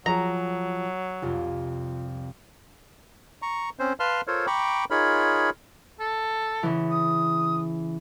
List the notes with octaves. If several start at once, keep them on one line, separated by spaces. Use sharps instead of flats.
F3 F#3 G#4 A#5
C2 F2 C3 F4 G4
A#5 C#6
C4 C#4 C5
B4 F5 A5 C6 F6
F4 A4 A#4 C5 C#5
G5 A#5 B5 C#6 D6
D#4 F4 G#4 A#4 C#5 B5
A4
C#3 E3
D#6